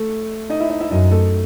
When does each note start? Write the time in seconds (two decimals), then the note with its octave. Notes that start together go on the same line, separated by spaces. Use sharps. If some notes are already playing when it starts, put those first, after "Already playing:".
Already playing: A3 A4
0.50 D#4 D#5
0.60 E4 E5
0.70 D#4 D#5
0.81 E4 E5
0.91 F#2 D#4 D#5
1.11 A3 A4